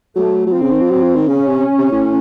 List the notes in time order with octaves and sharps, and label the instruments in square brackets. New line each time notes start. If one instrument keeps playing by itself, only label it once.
[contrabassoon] F#3 [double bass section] A3
[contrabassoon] F#3
[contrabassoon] F3 [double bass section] C4
[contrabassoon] C#3
D#3
F3
F#3
F3
D#3
[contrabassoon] C#3 [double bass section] C#4
[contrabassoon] C3
C3
A2